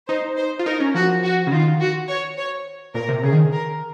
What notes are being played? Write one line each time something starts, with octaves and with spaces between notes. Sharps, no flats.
D#4 C5
C5
F4
D#4 A#4
C#4
F3 F#4
F#4
C#3
D#3 F4
F#4
C#5
C#5
A#2 A#4
C3
C#3 G#4
D#3
A#4